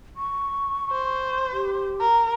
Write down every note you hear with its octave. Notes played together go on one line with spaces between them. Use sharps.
C#6
C5
G4
A#4